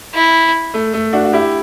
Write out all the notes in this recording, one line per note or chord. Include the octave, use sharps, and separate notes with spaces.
E4
A3
A3
D4 F#4
F#4
E4 G4